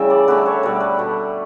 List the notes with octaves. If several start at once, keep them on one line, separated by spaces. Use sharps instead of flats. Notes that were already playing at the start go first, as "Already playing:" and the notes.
Already playing: C#3 E3 G3 A3 A4 B4 E5 G5
D5
D3 A3 B4
C#5
B2 G3 D5
B4
B2 A3